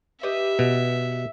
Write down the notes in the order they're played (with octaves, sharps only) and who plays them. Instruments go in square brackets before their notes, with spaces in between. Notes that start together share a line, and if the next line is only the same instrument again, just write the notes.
[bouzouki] G4 B4 D#5 [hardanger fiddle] E5
[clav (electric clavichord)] B2